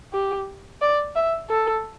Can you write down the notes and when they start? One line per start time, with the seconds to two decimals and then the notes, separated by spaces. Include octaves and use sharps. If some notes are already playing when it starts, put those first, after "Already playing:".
0.13 G4
0.82 D5
1.16 E5
1.49 A4